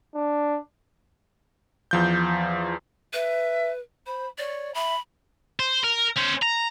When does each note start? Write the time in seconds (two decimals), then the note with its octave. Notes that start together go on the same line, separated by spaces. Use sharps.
0.15 D4
1.91 E2 F3 G6
3.13 B4 E5
4.06 C5 B5
4.38 C#5 D5
4.74 E5 B5
5.59 C5
5.84 A#4
6.16 C#4 C5
6.42 A#5